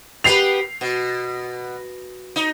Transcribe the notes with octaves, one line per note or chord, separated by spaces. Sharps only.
B3 G4 B4 C7 F7
B2
D#4